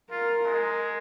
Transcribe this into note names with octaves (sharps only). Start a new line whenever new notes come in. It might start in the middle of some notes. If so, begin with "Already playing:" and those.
F4 A#4
G#3